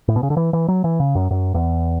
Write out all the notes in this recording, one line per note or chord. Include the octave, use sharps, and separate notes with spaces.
A2
B2
C#3
D3
E3
E3
F#3
E3
C#3
F#2
F#2
E2